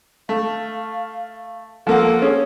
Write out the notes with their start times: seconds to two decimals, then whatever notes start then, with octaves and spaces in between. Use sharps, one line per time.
0.29 A3 F5
1.87 F3 A#3 A4 F#5
2.22 C#4 G#4